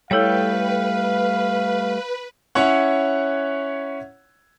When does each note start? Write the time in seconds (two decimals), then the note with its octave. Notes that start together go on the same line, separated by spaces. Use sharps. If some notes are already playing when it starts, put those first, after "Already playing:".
0.11 G3 A3 E4 A4 B4 C#5 F5 G5
2.55 C#4 E4 C#5 F#5